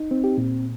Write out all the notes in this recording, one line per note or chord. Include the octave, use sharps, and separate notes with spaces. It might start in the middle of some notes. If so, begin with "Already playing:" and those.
Already playing: D#4
C4
G4
A#2